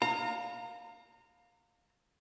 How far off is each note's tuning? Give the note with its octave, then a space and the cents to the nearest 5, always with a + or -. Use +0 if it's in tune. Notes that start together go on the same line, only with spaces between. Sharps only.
F5 +20 A#5 -30